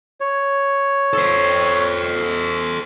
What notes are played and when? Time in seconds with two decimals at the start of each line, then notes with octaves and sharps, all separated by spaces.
0.21 C#5
1.13 A4 C5